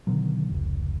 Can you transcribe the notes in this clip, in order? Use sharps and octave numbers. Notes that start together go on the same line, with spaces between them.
B2 D3 D#3 F#3
F1 C#2